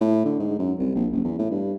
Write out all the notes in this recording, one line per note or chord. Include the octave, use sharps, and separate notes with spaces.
A2
D3
G#2
F#2
C2
A#1
F#1
E2
A2
G2